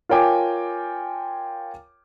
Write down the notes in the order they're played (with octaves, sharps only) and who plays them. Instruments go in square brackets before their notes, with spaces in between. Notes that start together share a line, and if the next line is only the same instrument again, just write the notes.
[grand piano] F4 A#4 C#5 G5 G#5 D6